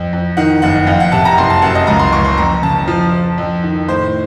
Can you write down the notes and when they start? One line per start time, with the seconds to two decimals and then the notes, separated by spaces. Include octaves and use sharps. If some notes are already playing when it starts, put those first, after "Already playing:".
Already playing: F2
0.13 F2
0.37 D#3 F#5
0.62 F#1 F#5
0.87 F2 F5
1.00 F#5
1.12 C3 A5
1.25 A#5
1.38 F#1 C6
1.50 A5
1.62 F#2 F#5
1.75 D#5
1.87 C#2 A#5
2.00 C6
2.13 C#2 C#6
2.25 C6
2.38 F2 A#5
2.63 C#3 A5
2.88 F3
3.12 F3
3.38 F2
3.63 D#3
3.88 A2 C5